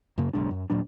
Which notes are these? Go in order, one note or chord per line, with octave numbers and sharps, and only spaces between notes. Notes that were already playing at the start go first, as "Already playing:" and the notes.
F#2 C#3 A#3
F#1 B1 G#3 D4
F#2
D#1 A#2 F#3 D4